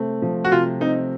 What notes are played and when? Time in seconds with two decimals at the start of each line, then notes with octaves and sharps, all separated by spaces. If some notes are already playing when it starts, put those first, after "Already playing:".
Already playing: C3 A3 C4
0.22 F3
0.44 F#4
0.52 C3 F4
0.81 C4 D#4